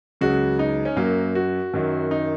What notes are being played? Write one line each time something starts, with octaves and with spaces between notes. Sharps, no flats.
C#2 C#3 F#3 F#4
D#4
C#4
F#2 F#3 A#3
F#4
F#2 D#3 F#3
D#4